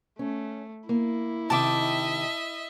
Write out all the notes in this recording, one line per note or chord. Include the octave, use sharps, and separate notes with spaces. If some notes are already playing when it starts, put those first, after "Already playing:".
A3 C#4
A#3 E4
C3 D#3 D#5 E5 G5 A5 D6